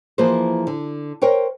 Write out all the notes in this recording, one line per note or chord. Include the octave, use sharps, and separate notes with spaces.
E3 F3 A#3 G#4 A#4 C5
D3
A#4 C5 C#5 G5